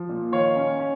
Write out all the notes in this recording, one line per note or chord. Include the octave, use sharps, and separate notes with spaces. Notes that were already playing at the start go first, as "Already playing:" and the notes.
Already playing: F3
A#2
D#3 C#5 F5
C#4
C#4